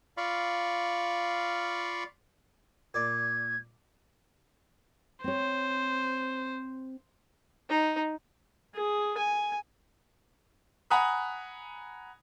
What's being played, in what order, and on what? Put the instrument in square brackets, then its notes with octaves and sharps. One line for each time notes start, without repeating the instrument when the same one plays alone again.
[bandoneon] F4 D5 F5 B5 C#6
[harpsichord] A#2 D5 [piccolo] G#6
[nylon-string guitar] C4 C#5 [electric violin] C5
[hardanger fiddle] D#4
[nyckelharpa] G#4
G#5
[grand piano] F#5 G#5 A#5 B5 D#6 F#6